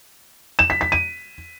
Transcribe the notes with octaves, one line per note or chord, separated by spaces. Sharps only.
E7
B6
B6
D#7